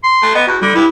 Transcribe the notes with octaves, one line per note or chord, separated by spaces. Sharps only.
C6
A3
B3 D#5
E2 F#4
D3 G3
G2 E4